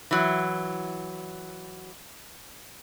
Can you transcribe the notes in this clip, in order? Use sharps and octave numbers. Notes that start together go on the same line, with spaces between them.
E3 F#3